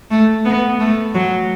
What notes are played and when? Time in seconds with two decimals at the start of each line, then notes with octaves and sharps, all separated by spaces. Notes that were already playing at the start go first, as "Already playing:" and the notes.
0.10 A3
0.45 B3
0.80 A3
1.15 F#3